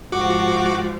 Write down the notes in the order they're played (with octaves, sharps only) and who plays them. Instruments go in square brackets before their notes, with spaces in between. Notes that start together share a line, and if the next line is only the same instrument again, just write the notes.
[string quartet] G#2 F3 [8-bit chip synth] F#4 D6